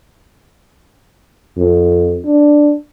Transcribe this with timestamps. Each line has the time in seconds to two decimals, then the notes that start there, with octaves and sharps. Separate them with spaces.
1.58 F2
2.25 D4